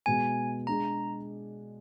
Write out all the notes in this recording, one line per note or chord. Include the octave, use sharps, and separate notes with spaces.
B2 G#3 B3 G#5
G#3 D4 G#4 A#5